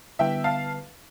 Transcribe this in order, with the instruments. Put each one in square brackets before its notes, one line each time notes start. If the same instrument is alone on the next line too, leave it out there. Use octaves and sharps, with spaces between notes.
[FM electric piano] D3 G3 B3 E4 B4 [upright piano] E5 G5
[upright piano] F5 A5